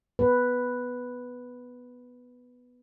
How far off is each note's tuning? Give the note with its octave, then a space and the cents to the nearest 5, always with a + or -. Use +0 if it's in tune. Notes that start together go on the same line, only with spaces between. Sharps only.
B3 +0 B4 +0